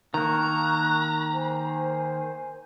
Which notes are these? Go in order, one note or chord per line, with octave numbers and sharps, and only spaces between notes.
D#3 A#3 A5 A#5 C#6 F#6
C5 G#5